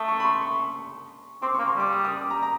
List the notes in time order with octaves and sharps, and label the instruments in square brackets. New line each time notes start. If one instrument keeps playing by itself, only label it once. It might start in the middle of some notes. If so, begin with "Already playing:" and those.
Already playing: [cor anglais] A3 [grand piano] D#6
[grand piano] C#6
B5
C6
C#6
[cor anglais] C4 [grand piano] D6
[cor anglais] A#3 [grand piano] C#6
[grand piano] C6
[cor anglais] G3 [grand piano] D6
[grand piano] D#6
D#6
D6
A#5
A#5